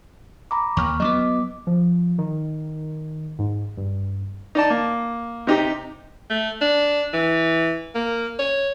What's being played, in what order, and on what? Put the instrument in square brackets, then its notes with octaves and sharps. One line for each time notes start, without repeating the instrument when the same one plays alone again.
[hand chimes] A#5 B5 D6
[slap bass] D#2 [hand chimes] C#6 F6
[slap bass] F#3 A#3 B3 [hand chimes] D#5 D6
[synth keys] F3
D#3
G#2
G2
[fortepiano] D#4 D5 A5
A#3
C3 D#4 G4
[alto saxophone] A3
D4
E3
A#3
C#5